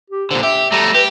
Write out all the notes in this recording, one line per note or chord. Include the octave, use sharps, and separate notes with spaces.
G4
A#2 D3 C5
G4 E5
G3 A3 A#5
G4 B4